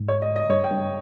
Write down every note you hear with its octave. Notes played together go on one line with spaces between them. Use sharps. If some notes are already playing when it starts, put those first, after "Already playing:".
Already playing: G#2
C#5
D#5
D#5
G2 C#5
G5
G2